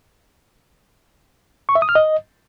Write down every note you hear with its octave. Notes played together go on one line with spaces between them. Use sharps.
C#6
E5
D#6
F6
D#5